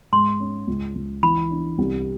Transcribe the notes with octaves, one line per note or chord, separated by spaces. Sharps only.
G#2 C6
C#4
C#2
C#2
E3 B5
D4
C2